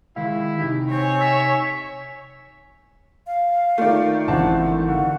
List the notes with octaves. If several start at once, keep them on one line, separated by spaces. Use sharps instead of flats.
D#3 G#3 E4 F5
C3 D#4 G4
C4 C#5 G#5
E5
F5
D#3 A3 F4 D5
G#1 C#3 E3 C4 D4 F#5 A5
D3 F5 F#5 C#6